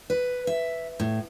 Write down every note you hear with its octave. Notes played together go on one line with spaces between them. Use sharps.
B4
E5
A2